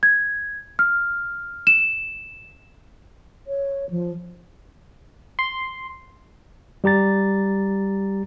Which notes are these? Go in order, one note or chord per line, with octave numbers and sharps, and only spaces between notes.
G#6
F6
E7
C#5
F3
C6
G3 G4 A#5 A6